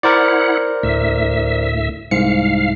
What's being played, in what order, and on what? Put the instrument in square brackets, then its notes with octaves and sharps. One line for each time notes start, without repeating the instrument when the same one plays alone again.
[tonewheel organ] E4 F#5 [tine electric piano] A#4 C5 D5
[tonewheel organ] D2 A2 E5
[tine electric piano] C2 G#2 C#7 [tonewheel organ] F5